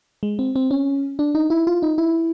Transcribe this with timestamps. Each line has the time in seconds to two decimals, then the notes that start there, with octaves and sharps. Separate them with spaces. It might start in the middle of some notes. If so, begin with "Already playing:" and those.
0.23 G#3
0.39 C4
0.56 C4
0.71 C#4
1.19 D4
1.35 D#4
1.50 E4
1.67 F4
1.82 D#4
1.98 E4